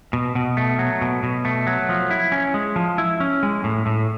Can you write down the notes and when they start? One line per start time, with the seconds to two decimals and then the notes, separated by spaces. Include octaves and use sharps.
0.13 B2
0.35 B2
0.57 A3
0.79 F#3
1.02 B2
1.23 B2
1.45 A3
1.67 F#3
1.89 F3
2.11 E4
2.32 C#4
2.54 G#3
2.76 F3
2.98 E4
3.20 C#4
3.43 G#3
3.64 A2
3.86 A2